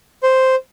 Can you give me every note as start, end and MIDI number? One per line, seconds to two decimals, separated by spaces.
0.23 0.55 72